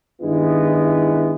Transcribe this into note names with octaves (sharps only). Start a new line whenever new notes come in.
G2 D#3 G#3 B3 E4